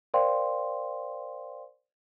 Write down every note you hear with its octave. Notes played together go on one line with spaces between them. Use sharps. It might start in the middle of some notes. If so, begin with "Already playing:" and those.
A#4 C5 D5 F5 G5 C6